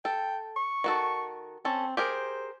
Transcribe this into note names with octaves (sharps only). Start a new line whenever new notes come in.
A4 G5
C#6
D#3 F#4 A4
C4 C#4 A4
G4 G#4 A#4 C5